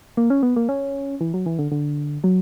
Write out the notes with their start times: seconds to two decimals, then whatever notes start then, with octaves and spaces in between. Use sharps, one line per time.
0.17 A#3
0.30 C#4
0.43 B3
0.56 A#3
0.69 C#4
1.21 E3
1.34 F#3
1.46 E3
1.59 D3
1.72 D3
2.24 F#3